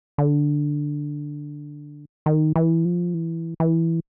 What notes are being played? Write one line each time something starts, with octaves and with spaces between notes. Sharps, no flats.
D3
D#3
E3
F3
E3
E3